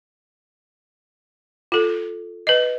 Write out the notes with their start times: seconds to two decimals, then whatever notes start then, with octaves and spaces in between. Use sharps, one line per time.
1.72 F4 A4
2.47 B4 D#5